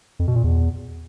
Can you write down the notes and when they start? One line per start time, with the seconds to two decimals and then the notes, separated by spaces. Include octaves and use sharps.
0.19 F2
0.28 B2
0.36 A#2
0.44 E2